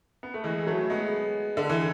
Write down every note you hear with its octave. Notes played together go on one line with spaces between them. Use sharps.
B3
A3
E3 G#3
F#3 A3
G#3 B3
D3
E3